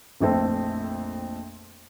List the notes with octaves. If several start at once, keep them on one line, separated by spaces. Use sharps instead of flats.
A#1 F2 A3 C4